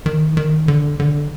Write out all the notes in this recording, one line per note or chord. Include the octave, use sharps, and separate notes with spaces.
D#3
D#3
D3
D3